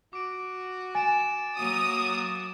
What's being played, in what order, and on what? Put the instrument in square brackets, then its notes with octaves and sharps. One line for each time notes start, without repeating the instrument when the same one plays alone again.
[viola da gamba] F#4 [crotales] D6 D7
[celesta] G#5 [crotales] A6 D7 E7
[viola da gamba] F#3 A#3 C#5 [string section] D#6